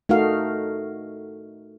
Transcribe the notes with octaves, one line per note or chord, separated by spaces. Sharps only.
A3 D#4 F#4 A#4 F5